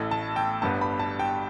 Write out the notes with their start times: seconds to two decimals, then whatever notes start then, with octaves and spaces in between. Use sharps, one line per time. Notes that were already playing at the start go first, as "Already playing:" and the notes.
Already playing: A1 A2 A3
0.11 A5
0.36 G5
0.62 G1 G2 G3 B3 A5
0.81 B5
0.99 A5
1.19 G5